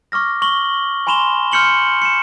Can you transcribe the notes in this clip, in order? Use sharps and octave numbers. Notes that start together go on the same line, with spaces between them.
C#6 D6 F6 A#6
C#6 F#7 G7
G#5 B5 C6 E7 F7 G7
C6 F6 G6 C#7 F#7 G7
C#7 E7